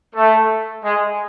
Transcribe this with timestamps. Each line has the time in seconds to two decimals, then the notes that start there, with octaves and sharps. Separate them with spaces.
0.14 A3
0.84 G#3